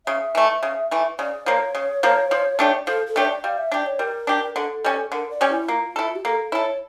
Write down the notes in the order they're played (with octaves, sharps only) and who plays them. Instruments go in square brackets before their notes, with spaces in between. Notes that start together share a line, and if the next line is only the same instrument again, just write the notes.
[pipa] C#3 [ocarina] E5
[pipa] E3 A3
C#3
E3 A3
[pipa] C#3 [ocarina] D5
[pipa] F3 A#3 [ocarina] C#5
[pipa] C#3
F3 A#3
F3
A3 D4 G4
[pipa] F3 [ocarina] A4
[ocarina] A4
[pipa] A3 D4 G4 [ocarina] C#5
[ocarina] D5
[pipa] G3 [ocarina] F5
[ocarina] E5
[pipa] D4 G4 [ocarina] D5
[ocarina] C#5
[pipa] G3 [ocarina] A#4
[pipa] D4 G4
[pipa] D3 [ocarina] A4
[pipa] G3 C#4
[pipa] D3 [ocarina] A#4
[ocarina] D5
[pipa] G3 C#4
[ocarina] E4
[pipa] A#3 [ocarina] F4
[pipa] E4 A4
[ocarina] G4
[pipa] A#3 [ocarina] A4
[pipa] E4 A4 [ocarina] C#5